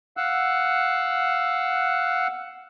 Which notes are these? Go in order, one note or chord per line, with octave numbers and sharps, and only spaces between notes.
F5 F#5 E6 F#6